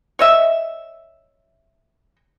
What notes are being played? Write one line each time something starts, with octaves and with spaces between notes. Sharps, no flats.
C#5 D#5 E5